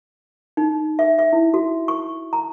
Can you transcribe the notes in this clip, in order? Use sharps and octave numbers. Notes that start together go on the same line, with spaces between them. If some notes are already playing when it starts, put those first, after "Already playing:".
D#4
E5
E5
E4
F#4
C#6
A#5